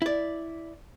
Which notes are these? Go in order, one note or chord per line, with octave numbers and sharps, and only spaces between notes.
E4 D5